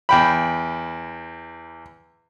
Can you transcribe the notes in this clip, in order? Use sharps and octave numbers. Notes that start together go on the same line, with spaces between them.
E2 G5 B5